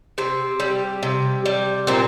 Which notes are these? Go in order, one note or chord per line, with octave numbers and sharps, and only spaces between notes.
C3 C4
G3
C3
G3
A#2 C4